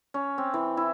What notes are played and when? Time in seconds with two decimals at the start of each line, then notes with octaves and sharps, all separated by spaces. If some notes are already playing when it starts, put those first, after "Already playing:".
0.14 C#4
0.38 C4
0.54 E3
0.77 E4